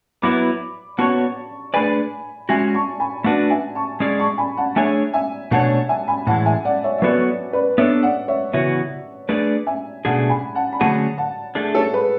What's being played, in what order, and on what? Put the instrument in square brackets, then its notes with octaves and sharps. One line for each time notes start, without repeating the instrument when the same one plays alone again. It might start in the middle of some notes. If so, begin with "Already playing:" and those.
[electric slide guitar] F#3 B3 E4 B4 [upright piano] B5 D6
[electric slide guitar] B3 F#4 C#5 [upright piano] A5 C#6
[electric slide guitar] A3 D4 G#4 B4 D5 [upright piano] G#5 B5
[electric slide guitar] G#3 C#4 F#4 [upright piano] E5 G#5
[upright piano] A5 C#6
G#5 B5
[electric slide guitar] A3 D4 F#4 B4 D5 [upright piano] F#5 A5
[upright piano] E5 G#5
A5 C#6
[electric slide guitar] G#3 C#4 G#4 D5
[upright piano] A5 C#6
G#5 B5
F#5 A5
[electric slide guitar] A3 D4 G#4 C#5 [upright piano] E5 G#5
[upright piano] E5 G#5
[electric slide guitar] B2 A3 D4 A4 C#5 [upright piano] F#5 A5
[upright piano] E5 G#5
G#5 B5
[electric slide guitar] A2 E3 G#3 [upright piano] F#5 A5
[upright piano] E5 G#5
D5 F#5
C#5 E5
E5
[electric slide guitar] F#3 B3 F#4 A4 C#5 [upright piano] B4 D5
[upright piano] B4 D5
[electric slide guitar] B3 D4 A4 [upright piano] C#5 E5
[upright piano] D5 F#5
C#5 E5
[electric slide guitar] C#3 E3 B3 F#4 [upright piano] C#5 E5
[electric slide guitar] A3 D4 G#4 B4 D5
[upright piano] E5 G#5
[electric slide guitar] B2 A3 D4 G#4 [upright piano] F#5 A5
[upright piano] G#5 B5
F#5 A5
B5
[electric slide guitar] D3 F#3 A3 C#4 G#4 [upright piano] F#5 A5
[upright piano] F#5 A5
[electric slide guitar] A3 D4 G#4
[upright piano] A4 C#5
G#4 B4